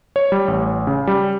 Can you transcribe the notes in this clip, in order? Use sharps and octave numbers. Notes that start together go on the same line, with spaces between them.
C#5
G3
A1
C#3
G3